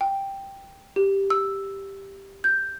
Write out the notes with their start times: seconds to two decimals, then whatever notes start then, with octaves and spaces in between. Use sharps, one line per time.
0.01 G5
0.96 G4
1.30 E6
2.44 G6